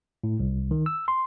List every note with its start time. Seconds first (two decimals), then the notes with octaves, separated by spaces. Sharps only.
0.24 A2
0.40 C2
0.71 D#3
0.86 E6
1.08 C6